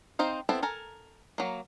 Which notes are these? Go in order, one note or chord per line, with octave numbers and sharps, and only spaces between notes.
C4 D#4 C5 F5
B3 C4 E4 A4
A4 A#4 G#5
F#3 A#3